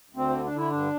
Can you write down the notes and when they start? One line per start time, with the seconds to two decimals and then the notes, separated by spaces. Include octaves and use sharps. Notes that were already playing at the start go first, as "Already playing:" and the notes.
0.10 D2
0.16 C4
0.30 D3
0.44 D4
0.51 D3
0.56 E4
0.70 G2 D4